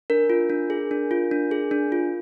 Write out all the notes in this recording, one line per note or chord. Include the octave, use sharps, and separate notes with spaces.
D4 A#4
F4
D4
G#4
D4
F4
D4
G#4
D4
F4